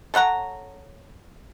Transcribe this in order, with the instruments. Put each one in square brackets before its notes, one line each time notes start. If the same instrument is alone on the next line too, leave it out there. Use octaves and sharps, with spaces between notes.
[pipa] A4 C#5 F#5 A#5